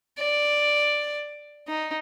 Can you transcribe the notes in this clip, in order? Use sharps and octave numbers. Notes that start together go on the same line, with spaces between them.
D5
D#4